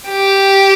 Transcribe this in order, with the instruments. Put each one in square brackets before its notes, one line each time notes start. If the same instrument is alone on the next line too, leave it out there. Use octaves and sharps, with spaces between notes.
[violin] G4